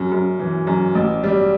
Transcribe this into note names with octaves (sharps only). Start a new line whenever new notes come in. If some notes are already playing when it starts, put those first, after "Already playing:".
Already playing: F#2
F#2
E3
F#2
A1
G3